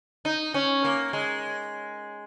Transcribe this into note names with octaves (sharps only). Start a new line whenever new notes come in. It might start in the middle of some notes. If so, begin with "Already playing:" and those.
D#4
C#4
A#3
G#3